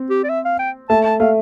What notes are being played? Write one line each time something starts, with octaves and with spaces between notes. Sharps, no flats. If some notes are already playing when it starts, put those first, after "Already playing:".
Already playing: C4
G4
D5
E5
F5
G5
A3 A5
A5
A3 F5